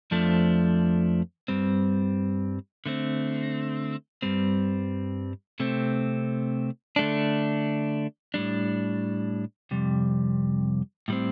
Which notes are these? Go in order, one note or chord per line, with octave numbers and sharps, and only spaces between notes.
F2 F3 A3 D4
G2 G3 C4
D3 A3 C4
G2 G3 C4
C3 A3 C4
D3 A3 D4
A2 G3 D4
F2 C3 G3
A2 G3 C4